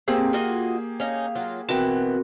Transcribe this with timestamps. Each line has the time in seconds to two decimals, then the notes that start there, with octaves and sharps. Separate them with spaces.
0.08 A#3 C4 G4 G#4
0.33 F4 F#4 D#5
1.00 C#4 D#4 F5
1.35 F#3 F4
1.69 B2 E3 B3 C4 F#4 A#4 G5